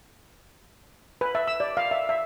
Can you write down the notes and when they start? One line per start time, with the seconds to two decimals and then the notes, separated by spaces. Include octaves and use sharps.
1.21 B4
1.35 E5
1.47 E6
1.60 D5
1.77 F5
1.91 E5
2.09 E5